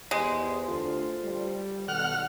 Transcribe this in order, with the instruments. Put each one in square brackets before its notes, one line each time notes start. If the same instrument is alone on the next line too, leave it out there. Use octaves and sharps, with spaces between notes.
[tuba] E2 [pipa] G#3 [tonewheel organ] G4 C5
[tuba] D2 [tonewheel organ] F4 A4 C5
[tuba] G3
[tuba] B1 [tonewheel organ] D#3 A4 [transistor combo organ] F#5 F6